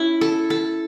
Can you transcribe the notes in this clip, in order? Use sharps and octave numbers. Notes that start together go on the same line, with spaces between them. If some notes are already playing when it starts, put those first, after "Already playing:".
Already playing: C#4 E4
A4
A4